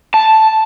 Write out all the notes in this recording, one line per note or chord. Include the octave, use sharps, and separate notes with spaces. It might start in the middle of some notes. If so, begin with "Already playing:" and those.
A5